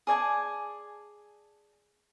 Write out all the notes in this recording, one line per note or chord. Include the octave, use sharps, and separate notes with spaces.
G#4 D5 G#5 A5